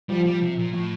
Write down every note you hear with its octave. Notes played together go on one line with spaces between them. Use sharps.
F3 G3
G3
C3
A#2
A2